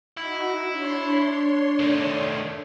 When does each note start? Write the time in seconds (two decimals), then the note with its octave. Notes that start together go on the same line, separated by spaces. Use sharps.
0.17 D#4 E4 F#4
0.69 D4 C#5 C6
1.79 D#3 A3